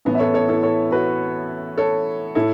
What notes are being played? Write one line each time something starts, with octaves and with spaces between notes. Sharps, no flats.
A1 A2 E3 B3
E5
A4 C#5
A4 C#5
E4 A4
A4 C#5
F#4 B4
A4 C#5
A2 E4 A4